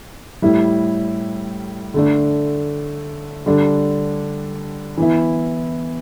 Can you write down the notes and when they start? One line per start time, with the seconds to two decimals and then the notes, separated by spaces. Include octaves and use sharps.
0.42 A2 G3 E4
1.94 D3 A3 D4
3.46 D3 G3 D4
4.97 E3 B3 E4